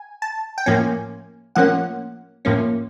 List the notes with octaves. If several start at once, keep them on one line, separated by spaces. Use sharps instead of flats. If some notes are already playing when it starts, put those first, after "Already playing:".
Already playing: G#5
A5
G5
A2 F3 A#3 C#4 G#5
A2 F3 A#3 C#4 F#5
A2 F3 A#3 C#4